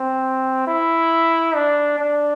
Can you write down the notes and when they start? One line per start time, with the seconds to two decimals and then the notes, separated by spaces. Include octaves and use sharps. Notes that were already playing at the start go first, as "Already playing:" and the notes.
Already playing: C4
0.67 E4
1.55 D4
1.99 D4